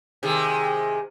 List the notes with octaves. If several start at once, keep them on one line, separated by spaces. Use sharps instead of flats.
C3 D#3 G#3